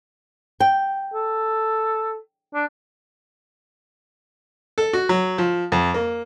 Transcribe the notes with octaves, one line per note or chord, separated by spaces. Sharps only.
G5
A4
D4
A4
F#4
F#3
F3
F2
A#3